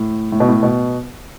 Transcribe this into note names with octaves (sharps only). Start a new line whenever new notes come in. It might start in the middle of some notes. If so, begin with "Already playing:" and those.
Already playing: A2
A2
B2
A2
B2